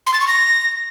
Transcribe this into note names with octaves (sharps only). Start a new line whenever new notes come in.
C6
A6
C#6
A#6